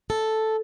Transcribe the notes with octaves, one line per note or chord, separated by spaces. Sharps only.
A4